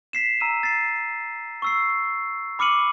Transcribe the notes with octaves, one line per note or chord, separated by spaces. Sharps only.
B6 C7 E7
A#5 E6 D#7 E7
A6 C7
C#6 E6 C7
B5 D6 F6 C#7 D#7 F#7